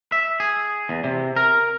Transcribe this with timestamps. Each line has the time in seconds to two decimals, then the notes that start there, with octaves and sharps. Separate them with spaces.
0.12 E5
0.40 G#4
0.89 E2
1.04 C3
1.36 A#4